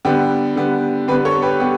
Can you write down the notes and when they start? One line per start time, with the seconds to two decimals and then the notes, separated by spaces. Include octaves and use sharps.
0.05 D3 G3 B3 G4
0.56 D3 G3 B3
1.08 D3 G3 B3 G4 B4
1.25 A4 C#5
1.42 G4 B4
1.60 G3 B3 G4